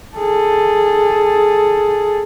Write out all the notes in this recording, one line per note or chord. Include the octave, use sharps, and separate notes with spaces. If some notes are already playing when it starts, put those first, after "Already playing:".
G#4 A4